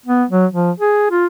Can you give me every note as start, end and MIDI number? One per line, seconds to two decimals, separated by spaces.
0.06 0.24 59
0.30 0.46 54
0.54 0.71 53
0.80 1.10 68
1.11 1.27 65